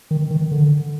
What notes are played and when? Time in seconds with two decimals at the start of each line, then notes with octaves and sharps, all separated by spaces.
0.11 D#3
0.30 D#3
0.51 D3